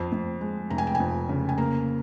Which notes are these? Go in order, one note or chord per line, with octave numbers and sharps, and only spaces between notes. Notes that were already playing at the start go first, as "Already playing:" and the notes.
Already playing: F2 C5
F2
G#3
F1 A#5
G#5
G5
G#5
F2
C#3
G#5
A#3 A#5